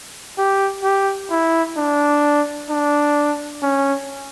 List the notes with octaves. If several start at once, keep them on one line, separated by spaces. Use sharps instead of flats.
G4
G4
E4
D4
D4
C#4